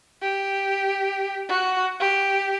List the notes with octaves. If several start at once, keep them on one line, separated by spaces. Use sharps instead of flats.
G4
F#4
G4